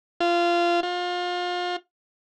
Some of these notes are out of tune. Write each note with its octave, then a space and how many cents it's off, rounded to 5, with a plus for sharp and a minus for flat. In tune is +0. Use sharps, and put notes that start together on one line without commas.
F4 -20
F4 +30